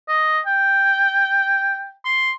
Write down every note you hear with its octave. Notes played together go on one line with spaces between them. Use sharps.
D#5
G5
C6